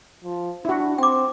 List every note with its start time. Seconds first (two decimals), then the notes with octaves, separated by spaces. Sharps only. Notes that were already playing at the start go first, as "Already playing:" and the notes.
0.24 F3
0.65 D4 E4 F#4
0.98 C4 G5 D6